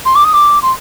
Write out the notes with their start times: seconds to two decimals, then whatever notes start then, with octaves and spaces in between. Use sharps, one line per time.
0.05 C6
0.15 D6
0.24 D#6
0.33 D6
0.62 C6